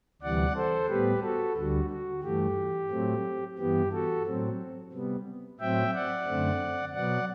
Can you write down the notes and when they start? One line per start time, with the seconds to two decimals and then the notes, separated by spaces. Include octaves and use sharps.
0.22 D2 C3 E3 G3 D5 F#5
0.56 A4 C5
0.89 A2 G3 B3 G4 B4
1.23 F#4 A4
1.56 D2 D3 G3 F#4
1.90 F#4
2.23 G2 E3 A3 G4
2.91 A2 F#3 A3 C4
3.58 G2 E3 B3 G4
3.92 F#4 A4
4.26 A2 F#3 C4
4.93 C3 G3 B3
5.60 A2 F#3 C4 E5 G5
5.94 D5 F#5
6.27 F#2 D3 A3 C4
6.94 B2 F#3 B3 D5 F#5